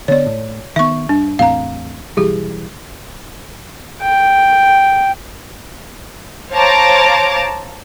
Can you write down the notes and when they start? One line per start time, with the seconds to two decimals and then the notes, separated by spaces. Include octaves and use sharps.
0.08 D3 B3 C#5 D5
0.26 A2
0.76 D#3 B3 E5 C#6
1.09 G2 D4
1.39 E2 A2 C4 F5 A#5
2.17 B1 E3 G3 G4 G#4
4.02 G5
6.52 C5 C#5 F5 A5 A#5 D6